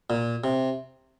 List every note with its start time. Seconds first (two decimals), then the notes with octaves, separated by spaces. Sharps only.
0.10 A#2
0.44 C3